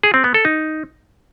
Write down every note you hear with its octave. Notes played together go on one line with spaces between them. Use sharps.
G#4
C4
B3
A4
D#4